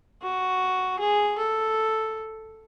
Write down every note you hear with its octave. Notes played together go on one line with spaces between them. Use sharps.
F#4
G#4
A4